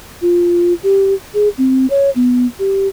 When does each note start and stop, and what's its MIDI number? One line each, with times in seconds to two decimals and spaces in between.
0.22 0.73 65
0.83 1.14 67
1.34 1.49 68
1.58 1.86 60
1.90 2.10 73
2.16 2.46 59
2.59 2.88 67